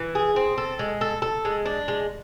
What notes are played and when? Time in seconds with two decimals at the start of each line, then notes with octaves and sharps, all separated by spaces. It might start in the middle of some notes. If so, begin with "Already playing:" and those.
Already playing: E3
0.15 G#4
0.36 C4
0.58 A4
0.79 G#3
1.01 A4
1.22 A4
1.45 G#3
1.66 D4
1.88 G#3